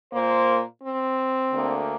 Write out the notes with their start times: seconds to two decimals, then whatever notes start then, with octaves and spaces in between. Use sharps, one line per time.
0.12 A#2 A#3 C5
0.82 C4
1.52 D2 D3 A#3